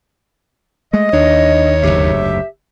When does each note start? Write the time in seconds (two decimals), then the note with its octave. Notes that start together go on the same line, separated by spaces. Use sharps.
0.93 G#3 A3 D#5
1.13 D#2 D4 C#5
1.83 F#1 D2 G#2 G4 E5